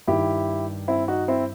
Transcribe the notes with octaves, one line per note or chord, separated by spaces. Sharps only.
G2 D#3 E4 G4
C4 E4
D#4 F#4
C4 E4